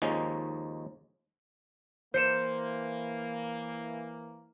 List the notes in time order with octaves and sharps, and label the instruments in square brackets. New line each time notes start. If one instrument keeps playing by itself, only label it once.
[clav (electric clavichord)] D#2 F3 G#3 C#4 D#4
[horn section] E3 A#3 [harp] C5 C#7 E7